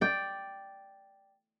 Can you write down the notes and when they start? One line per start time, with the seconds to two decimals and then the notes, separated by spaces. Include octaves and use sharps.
0.01 D5 G5